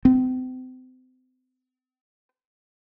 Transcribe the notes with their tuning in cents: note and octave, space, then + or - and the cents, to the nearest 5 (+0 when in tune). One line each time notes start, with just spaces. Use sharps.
C4 -40